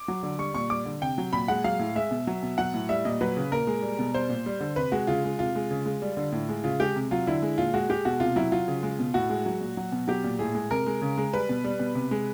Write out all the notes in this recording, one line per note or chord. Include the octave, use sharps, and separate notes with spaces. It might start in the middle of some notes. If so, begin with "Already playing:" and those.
Already playing: D6
F#3
D3
G3 C#6
A#2 C#6
G3 D6
D3
C3 G5
F#3
A#2 B5
G#3 F#5
F#3 F5
A2
G#3 E5
B2
F#3
B2
F#3 F#5
A2
G3 E5
A#2 D#5
F#3 B4
C#3
A#2 A#4
G#3
G3
B2
G3 C5
A#2
G3
D3
C3 B4
G#3 F#4
C#3 F4
G#3
C3 F4
G#3
C#3
G#3
G3
D3
A2
G#3
C#3 F4
G#3 G4
C3
F#3 F4
D3 E4
G#3
A#2 F4
G#3 F#4
G#3 G4
B2 F#4
C3 F4
F#3 E4
F#3 F4
C#3
G#3
B2
A2 F#4
G#3
F#3
A#2
F#3
B2
F#3 G4
A#2
A2 G#4
G#3
C3 A#4
G#3
C#3
G#3
G3 B4
B2
G3
B2
C3
G#3